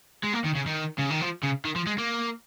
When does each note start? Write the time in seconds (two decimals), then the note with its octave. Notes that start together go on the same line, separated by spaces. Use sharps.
0.23 G#3
0.33 A#3
0.44 D#3
0.55 C#3
0.66 D#3
0.98 C#3
1.10 D#3
1.21 F3
1.43 C#3
1.65 D#3
1.76 F3
1.87 G#3
1.98 A#3